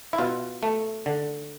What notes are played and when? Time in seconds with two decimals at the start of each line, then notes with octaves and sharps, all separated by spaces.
0.13 E4
0.18 B2 F4
0.63 A3
1.06 D3